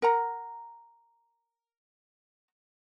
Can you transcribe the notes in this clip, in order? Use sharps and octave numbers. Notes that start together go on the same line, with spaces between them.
A#4 F#5 A#5